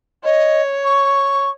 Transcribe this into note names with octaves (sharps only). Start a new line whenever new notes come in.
C#5 D#5
C#6